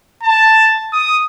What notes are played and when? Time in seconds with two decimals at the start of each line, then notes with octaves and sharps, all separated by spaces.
0.23 A5
0.93 D#6